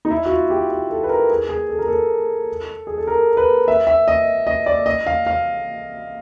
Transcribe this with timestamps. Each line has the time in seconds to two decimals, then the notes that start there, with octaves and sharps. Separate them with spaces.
0.05 D#4
0.10 E4
0.26 F#4
0.30 F4
0.50 G4
0.71 G4
0.90 A4
1.03 B4
1.09 A#4
1.30 G#4
1.49 G#4
1.69 A4
1.79 A#4
1.88 A4
2.87 G#4
2.98 A4
3.07 A#4
3.37 B4
3.68 E5
3.87 E5
4.08 D#5
4.47 D#5
4.66 D5
4.86 D#5
5.06 F5
5.26 F5